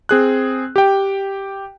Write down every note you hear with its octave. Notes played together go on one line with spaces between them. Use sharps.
C4 G#4 F#6
G4 G5